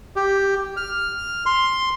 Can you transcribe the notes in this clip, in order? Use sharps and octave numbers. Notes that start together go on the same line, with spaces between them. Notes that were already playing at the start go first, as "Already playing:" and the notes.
G4
F6
C6